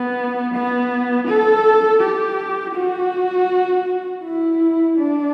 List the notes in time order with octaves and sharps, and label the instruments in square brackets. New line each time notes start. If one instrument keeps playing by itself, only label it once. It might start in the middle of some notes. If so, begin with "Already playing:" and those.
Already playing: [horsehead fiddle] B3
B3
A4
G4
F#4
E4
D4